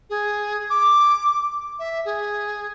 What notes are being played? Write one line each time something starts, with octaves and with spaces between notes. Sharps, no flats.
G#4
D6
E5
G#4